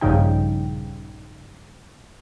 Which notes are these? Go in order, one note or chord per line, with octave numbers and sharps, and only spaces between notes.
A#1 G2 C#3 D#4 G5